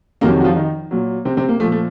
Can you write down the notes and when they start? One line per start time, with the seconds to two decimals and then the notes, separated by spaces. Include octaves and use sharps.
0.21 F2 C3 D#3 F#3 A#3 A#4
0.41 F#4
0.44 F3 F4
0.56 D#3 D#4
0.91 A#2 F#3
1.25 C3 C4
1.37 C3 C4
1.49 A#3
1.60 A#2 F3 A3
1.72 A3